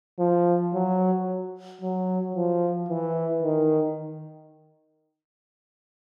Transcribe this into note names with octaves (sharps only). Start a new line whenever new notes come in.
F3
F#3
F#3
F3
E3
D#3